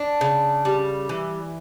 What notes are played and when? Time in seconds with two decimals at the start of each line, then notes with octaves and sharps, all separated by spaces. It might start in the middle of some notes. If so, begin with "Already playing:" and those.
Already playing: D4
0.21 C#3
0.65 G3
1.09 E3